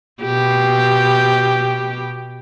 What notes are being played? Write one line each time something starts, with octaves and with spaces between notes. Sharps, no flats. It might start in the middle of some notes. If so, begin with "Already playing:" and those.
B2 G4